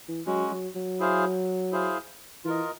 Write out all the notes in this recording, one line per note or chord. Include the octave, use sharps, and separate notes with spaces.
E3
F#3 G#3 C#4 F#4
F#3
F#3
E4 G#4 C5 F5
E4 G#4 C5 F5
E3 F4 A#4 D#5